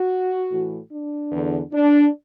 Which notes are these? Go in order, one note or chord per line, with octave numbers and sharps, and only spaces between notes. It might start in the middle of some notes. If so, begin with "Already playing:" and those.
Already playing: F#4
A2 E3
D4
E2 D3
D4